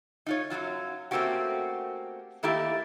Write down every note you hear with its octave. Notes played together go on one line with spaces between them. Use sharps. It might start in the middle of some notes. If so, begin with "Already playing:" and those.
D#4 F4 C#5
F#2 A#2 F#3 F4
A3 A#3 C4 C#4 F#4 G4
D#3 A3 A#3 E4 G4